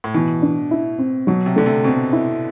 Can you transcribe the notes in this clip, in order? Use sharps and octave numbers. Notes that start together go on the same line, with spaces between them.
A2
B2 E3
D4
E4
C4
B2 F#3
C3
D3 A3
C3
B2 C4
E4